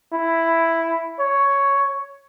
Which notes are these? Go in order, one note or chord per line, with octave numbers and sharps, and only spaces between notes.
E4
C#5